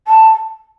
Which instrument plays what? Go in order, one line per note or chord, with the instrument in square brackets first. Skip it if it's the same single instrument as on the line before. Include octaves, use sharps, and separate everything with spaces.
[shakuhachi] A5